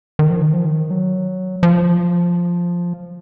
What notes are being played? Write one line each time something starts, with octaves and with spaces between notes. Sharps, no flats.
D#3
F3
D#3
F3
D#3
F#3
F3